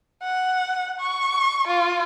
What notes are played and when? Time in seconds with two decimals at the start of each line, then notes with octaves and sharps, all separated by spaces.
0.22 F#5
1.00 C#6
1.67 F4